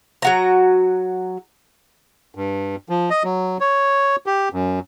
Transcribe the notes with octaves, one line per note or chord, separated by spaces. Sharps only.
F#3 F#4 A#5
G2
F3
D#5
F#3
C#5
G4
F#2